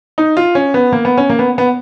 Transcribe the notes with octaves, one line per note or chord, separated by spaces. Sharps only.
D#4
F4
C#4
B3
A#3
B3
C#4
A#3
B3
B3